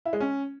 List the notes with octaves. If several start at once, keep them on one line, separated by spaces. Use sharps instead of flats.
E4
G#3
C#4